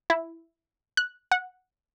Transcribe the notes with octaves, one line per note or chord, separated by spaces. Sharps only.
E4
F#6
F#5